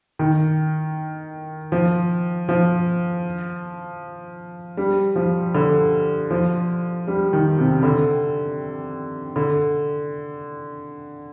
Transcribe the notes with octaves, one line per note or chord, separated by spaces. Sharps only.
D#3
F3
F3
G3
F3
D3
F3
G3
D#3
C3
D3
D3